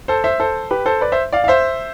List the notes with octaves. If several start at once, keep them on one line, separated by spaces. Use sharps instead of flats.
A4 C5
C5 E5
A4 C5
G4 B4
A4 C5
B4 D5
C5 E5
D5 F5
F5
C5 E5